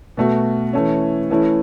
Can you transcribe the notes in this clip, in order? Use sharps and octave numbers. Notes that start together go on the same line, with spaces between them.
B2 A3 F#4
E3 A3 C#4
E3 A3 C#4 E4